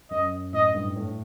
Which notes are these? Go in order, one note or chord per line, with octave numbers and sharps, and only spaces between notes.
F#2 D#5
A2 D#5
G2
A2